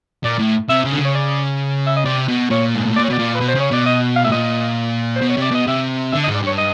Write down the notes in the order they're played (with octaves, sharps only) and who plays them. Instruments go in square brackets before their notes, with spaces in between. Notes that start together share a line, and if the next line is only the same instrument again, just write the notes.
[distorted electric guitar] A#2 [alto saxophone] D5
[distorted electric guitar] A2
[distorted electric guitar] C3 [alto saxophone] E5
[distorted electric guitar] C#3
D3
C#3
[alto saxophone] C#5
D5
E5
D#5
[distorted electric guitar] C3 [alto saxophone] D5
[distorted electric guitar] B2
[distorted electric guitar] A#2 [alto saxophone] C#5
[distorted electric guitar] G#2
A2
[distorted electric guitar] A#2 [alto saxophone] D5
[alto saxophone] C#5
[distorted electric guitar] B2 [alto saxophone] D5
[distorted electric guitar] A#2
[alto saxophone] B4
[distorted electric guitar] B2
[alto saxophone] C5
[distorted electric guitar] C#3 [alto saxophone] C#5
[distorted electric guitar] B2 [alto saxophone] D5
[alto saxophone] D#5
F5
[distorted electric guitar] A2 [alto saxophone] E5
[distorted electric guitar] A#2 [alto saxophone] D#5
[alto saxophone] C5
[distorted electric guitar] B2
[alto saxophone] C#5
[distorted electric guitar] C3 [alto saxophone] D5
[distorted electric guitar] B2 [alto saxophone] D#5
[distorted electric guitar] C3 [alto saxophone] E5
[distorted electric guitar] D3 [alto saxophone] E5
[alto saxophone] D#5
[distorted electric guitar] G#2
[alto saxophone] D5
[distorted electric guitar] G2 [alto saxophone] C#5
[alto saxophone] D#5